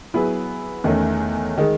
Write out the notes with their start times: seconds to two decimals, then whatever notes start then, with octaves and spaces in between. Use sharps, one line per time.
0.14 F#3 B3 E4 G#4 B4
0.84 E2 D#3 A3 C#4
1.57 D#3 G#3